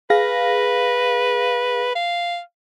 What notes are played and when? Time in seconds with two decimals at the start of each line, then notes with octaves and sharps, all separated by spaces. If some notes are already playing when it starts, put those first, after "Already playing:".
0.10 G#4 B4 F5 A#6
1.95 F5